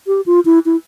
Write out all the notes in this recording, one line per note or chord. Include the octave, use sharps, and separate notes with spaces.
G4
F4
E4
E4